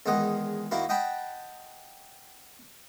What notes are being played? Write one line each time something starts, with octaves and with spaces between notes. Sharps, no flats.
E2 D#3 G#3 D#5 F#5
D#3 A#3 E4 F#4
D#5 F#5 G5 A5 B5